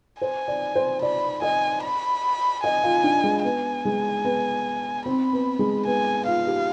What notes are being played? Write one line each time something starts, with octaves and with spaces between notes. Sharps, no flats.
C5 G#5
D5
C5
D5 B5
D#5 G#5
B5
D#5 G#5
F4
D4
G#3
B3 G#5
G#3
B3
C4 B5
B3
G#3
B3 G#5
F4 F5
G4